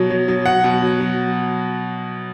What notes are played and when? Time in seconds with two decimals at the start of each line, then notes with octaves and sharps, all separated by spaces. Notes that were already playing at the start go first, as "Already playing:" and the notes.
Already playing: B2 F#3
0.10 F#3
0.28 F#3
0.46 F#3 F#5
0.64 B2
0.82 F#3
1.00 F#3